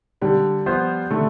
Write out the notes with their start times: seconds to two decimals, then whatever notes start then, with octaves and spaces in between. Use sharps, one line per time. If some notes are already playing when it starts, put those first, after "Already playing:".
0.21 D3 G3
0.66 F3 B3 F4 C5
1.10 D3 A3